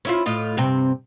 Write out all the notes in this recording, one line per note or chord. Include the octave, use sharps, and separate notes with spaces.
C#4 E4 F4
A2 F4 D#5
G2 C3 C4